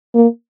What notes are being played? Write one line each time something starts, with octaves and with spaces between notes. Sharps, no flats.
A#3